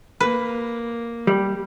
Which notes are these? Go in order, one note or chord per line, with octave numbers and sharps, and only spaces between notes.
A#3 B4
G3